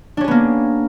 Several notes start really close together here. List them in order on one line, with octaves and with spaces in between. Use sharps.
D4 C#4 G#4 B3 A#3